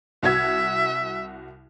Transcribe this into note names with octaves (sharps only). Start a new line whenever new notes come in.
C2 F#4 E5 G#6